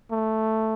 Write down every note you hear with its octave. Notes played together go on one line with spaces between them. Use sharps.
A3